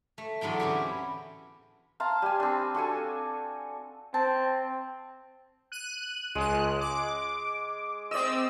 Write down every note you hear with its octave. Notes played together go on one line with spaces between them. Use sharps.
A3
E2 A2 D3 F#3 G5
E3 C4 C#4 G4
F5 A5 A#5 C6
G3 G#5
C4 D4
D4 F#4 A4 G#5
C4 A5
F#6 D#7
C#2 G#3 F#6
D6
C4 D5 D#5 E6